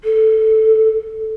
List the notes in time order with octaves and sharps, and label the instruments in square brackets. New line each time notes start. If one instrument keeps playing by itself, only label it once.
[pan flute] A4